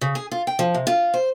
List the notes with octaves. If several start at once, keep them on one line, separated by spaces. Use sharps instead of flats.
C#3
G#4
F4
G5
F3
C3
F4
C5